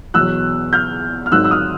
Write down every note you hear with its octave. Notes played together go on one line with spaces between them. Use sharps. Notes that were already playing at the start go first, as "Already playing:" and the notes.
E2 B2 F#3 E6 F#6
F6 G6
F6
G#1 G#2 D#3 F#3 E6 F#6
E6
D#6 F6